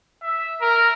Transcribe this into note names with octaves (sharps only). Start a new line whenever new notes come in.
E5
A#4